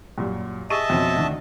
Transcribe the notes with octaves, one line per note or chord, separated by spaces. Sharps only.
F#2 A#2 G3
G#4 D#5 E5 A5 C#6 D#7
F2 B2 C#4
D2 D#3 D4